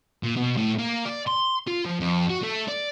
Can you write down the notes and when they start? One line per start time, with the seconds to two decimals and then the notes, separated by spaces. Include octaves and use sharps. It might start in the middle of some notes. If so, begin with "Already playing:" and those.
0.23 A#2
0.37 B2
0.57 A2
0.78 A#3
1.05 D5
1.27 C6
1.67 F4
1.85 F3
2.00 F2
2.30 F#4
2.43 A3
2.69 D5